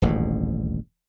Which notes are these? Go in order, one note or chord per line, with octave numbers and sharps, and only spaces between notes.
D#1 A1 D2 G#2